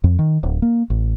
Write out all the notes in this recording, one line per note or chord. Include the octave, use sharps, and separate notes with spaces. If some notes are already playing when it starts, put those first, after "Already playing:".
F2
D#3
D1
A#3
A1